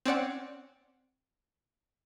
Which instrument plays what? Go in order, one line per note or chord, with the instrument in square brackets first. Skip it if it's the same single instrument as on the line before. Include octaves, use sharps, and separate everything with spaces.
[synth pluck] C4 C#4 D5 F#5